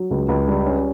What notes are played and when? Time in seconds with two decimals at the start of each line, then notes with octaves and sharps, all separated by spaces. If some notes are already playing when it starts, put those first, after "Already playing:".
Already playing: F#3
0.11 C#2
0.28 C#2
0.48 G3
0.66 C#4